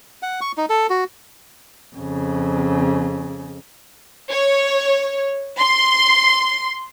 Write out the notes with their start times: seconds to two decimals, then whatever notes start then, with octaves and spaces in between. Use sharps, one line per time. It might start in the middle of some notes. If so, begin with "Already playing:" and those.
0.23 F#5
0.41 C#6
0.57 D#4
0.70 A4
0.90 F#4
1.95 F2 C#3
4.31 C#5
5.59 C6